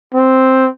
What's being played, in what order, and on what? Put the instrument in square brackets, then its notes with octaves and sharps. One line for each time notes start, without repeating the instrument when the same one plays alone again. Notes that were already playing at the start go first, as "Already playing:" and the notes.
[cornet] C4